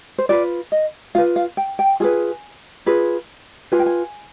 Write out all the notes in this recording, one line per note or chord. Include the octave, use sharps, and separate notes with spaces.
C5
F4 B4 D5
D#5
F4 B4 F5
F5
G5
G5
F4 G#4 B4 G#5
F4 G#4 B4
F4 B4 G#5
G5
G#5